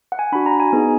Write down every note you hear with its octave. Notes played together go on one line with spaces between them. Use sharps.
F#5
G#5
D4 F#4 B5
A#5
G#5
B3 D#4 G#4